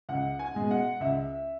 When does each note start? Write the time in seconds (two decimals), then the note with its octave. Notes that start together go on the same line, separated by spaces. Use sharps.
0.09 C#2 F#5
0.39 G#5
0.55 B2 G#3
0.71 F#5
1.00 C#2 E5